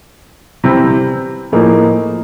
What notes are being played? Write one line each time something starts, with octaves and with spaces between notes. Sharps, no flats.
C3 E3 G3 C4 E4
A2 F3 A#3 D#4 G#4